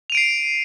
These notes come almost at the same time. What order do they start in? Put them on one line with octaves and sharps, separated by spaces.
F7 D#7 D7 C7